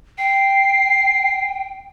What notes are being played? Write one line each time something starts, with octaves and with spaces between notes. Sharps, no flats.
G5 C7